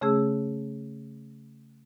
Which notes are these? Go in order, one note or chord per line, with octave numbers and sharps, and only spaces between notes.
C#3 A3 C#4 G#4 E6